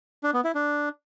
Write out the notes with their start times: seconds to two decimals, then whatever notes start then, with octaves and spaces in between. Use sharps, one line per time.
0.23 D4
0.34 B3
0.44 E4
0.55 D4